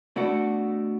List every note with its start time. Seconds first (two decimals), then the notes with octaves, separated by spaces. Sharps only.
0.16 B2 A3 D4 F#4